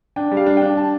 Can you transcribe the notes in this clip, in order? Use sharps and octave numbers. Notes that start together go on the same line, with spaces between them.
D4 G5
G3
F5
D4
D4 G5
A5